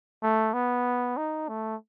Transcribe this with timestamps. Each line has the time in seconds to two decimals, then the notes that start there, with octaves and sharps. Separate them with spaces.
0.23 A3
0.54 B3
1.17 D#4
1.48 A3